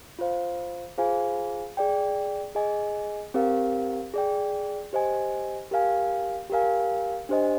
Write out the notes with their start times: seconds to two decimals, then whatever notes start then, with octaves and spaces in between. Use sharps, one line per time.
0.19 F4 C5 F5
0.98 F4 G#4 C5 F5 G#5
1.77 G#4 D5 G5
2.55 G#4 D#5 G#5
3.34 C4 G4 A#4 F5
4.14 G#4 D5 G5
4.93 G4 C5 D#5 G#5
5.71 G4 A#4 F5 G#5
6.50 G4 A#4 F5 G#5
7.29 D4 G4 C5 D#5 G#5